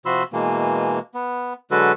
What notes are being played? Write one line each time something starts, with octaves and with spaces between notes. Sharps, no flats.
C3 F3 F#4 B5 C6 E6
B2 E3 G#3 A#3
B3
D3 F#3 G#3 F#4 A4 B4